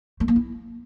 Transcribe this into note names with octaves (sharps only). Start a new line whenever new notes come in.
A3
A#3
E4